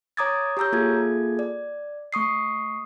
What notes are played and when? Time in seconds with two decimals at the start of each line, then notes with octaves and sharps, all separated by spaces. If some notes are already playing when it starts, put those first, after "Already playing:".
0.17 C#5 A#5 D6 D#6 G#6 A6
0.57 G4 C#5 A#5 E6 G6
0.72 A#3 F4 G#4 A4 G#6
1.39 D5
2.13 A3 C#6 D#6 C7